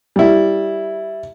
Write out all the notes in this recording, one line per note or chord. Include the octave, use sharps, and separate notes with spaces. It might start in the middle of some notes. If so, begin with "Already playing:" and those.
G3 E4